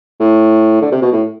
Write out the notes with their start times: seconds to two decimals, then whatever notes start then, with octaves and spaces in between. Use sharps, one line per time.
0.20 A2
0.82 D3
0.92 C3
1.02 B2
1.12 A2